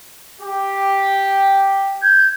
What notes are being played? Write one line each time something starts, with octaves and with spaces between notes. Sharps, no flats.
G4
G6 G#6